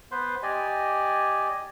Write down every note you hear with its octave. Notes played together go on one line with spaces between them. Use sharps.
B3 B4 C5 C6
G4 D5 D#5 G#5